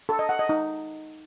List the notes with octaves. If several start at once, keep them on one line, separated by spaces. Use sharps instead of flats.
A4
D#5
F#5
D#5
D#4